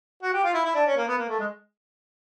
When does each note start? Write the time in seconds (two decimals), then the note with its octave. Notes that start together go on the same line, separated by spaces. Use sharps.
0.22 F#4
0.33 G4
0.44 F4
0.54 E4
0.64 E4
0.75 D4
0.87 C#4
0.97 A#3
1.08 B3
1.18 A#3
1.28 A3
1.39 G#3